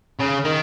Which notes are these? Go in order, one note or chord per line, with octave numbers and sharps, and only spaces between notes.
C#3
D#3